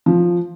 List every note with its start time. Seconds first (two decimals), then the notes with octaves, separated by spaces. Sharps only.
0.06 F3